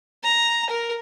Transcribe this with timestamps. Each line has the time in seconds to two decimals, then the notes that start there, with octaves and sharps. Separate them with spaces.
0.24 A#5
0.70 A#4